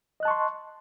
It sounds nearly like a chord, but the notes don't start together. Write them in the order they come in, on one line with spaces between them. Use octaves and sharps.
D#5 F#6 A5 C#6 C6